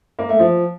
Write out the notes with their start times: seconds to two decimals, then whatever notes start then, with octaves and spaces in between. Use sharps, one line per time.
0.19 A#3
0.29 A3
0.39 F3